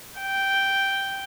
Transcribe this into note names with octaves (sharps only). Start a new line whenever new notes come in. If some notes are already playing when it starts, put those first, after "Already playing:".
G5